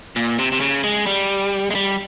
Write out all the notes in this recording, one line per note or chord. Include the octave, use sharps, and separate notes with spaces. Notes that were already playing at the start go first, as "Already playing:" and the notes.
A#2
C3
C3
C#3
G#3
G3
G#3
G3